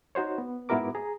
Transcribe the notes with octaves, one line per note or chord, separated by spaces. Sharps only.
D#4 F#4 C5 C#5
B3
G#2 B3 E4 F#4 A#4 D6
G#4 A#5